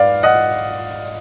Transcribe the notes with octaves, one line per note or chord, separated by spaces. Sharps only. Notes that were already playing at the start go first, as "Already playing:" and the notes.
Already playing: G#2 B4 D5 F5
D#5 F#5